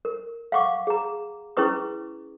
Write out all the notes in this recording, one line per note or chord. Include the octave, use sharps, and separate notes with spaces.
A#4
F5 F#5 C#6 D6
G#4 A#5
C#4 E4 G#4 B4 C#6 D#6